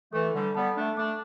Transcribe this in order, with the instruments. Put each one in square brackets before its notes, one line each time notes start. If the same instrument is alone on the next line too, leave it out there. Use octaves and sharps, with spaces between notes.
[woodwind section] E3 A3 [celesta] A4
[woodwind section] D3 G3
[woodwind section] G3 B3 [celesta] A5
[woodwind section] A3 D4
[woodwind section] A3 D4 [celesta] D6